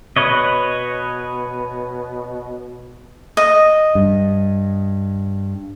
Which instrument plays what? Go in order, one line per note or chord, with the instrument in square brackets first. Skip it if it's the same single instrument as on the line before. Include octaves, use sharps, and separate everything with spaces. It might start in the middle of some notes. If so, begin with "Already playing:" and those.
[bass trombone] B2 [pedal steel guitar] B4 C#5 D#5
[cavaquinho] D#5
[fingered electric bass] G2